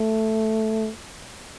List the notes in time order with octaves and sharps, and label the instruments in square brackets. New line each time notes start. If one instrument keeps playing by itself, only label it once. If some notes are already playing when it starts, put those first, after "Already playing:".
Already playing: [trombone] A3